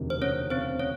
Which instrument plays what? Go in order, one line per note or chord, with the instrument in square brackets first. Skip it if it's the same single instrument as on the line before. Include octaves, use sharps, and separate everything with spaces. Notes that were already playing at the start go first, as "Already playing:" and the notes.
Already playing: [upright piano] E1 D2 C3 D#3
[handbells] C5
C#4 C#5
C4 C5
C#4 C#5